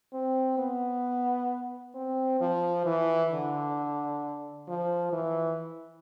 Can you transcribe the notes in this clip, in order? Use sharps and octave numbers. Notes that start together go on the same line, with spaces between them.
C4
B3
C4
F3
E3
D3
F3
E3